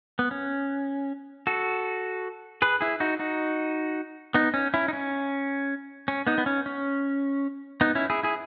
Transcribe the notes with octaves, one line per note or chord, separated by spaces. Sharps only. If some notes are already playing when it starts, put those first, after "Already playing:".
B3
C#4
F#4 A4
G#4 B4
E4 G#4
D#4 F#4
D#4 F#4
B3 D#4
C#4
C#4 E4
D#4
C#4
C#4
B3 D#4
B3
C#4
C#4
B3 D#4
C#4 E4
E4 G#4
E4 G#4